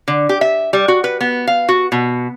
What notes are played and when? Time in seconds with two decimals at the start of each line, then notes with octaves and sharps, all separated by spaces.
0.08 D3
0.29 G4
0.41 E5
0.73 G3
0.88 F#4
1.04 B4
1.21 B3
1.47 F5
1.69 F#4
1.92 B2